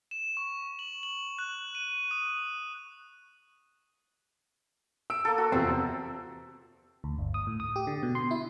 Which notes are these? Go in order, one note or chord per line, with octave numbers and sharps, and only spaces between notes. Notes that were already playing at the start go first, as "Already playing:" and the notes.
E7
C#6
F#7
F#7
F#6
D#7
D#6
E6 D7
A#3 A4
F#4
E2 C3 F3 C4
D2
G1
D#6
A2
D#6
G4
D3
B2
C6
E4